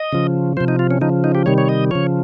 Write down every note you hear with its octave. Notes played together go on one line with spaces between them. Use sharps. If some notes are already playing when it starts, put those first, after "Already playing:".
Already playing: D#5
C#3 F3
C3 F3 C5
D#4
F4
C#4
C#3 F3 D#4
D#4
G4
C3 D#3 G3 C#5
C#5
D#5
C#3 F3 C#5